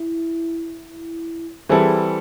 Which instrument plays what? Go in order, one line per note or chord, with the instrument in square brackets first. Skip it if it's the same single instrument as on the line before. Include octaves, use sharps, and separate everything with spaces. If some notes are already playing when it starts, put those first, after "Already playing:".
Already playing: [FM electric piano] E4
[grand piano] E3 G3 C4 E4 A4 [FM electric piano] G#4